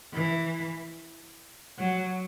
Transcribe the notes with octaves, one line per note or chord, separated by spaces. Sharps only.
E3
F#3